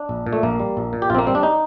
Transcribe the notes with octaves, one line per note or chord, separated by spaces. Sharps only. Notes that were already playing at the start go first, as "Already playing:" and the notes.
Already playing: D4
A#1
A#2
A3
A#1 A#3
G3
A#1
A#2
G4
A#1 C4 F4
A#3
G3 C4
D4
D#4